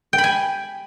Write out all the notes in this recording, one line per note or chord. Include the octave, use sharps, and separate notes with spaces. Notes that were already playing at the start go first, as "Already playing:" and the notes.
G5
B5
G#5